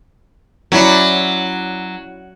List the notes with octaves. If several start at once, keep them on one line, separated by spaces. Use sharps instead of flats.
F#3 C#4 E4 D5